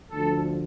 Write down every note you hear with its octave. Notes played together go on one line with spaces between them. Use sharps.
D2 D3 F3 A4